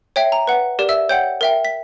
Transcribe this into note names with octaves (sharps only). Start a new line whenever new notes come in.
C#5 E5 G5
A#5
B4 F#5
G4 A#4 D5
E5 E6
C#5 F#5 G5 G6
A#4 E5 G5
B6